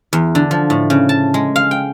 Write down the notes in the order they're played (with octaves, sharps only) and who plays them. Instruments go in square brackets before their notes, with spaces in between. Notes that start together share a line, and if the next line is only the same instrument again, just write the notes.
[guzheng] E2
D3
F3
A2
C#3
A5
G#3
F5
G5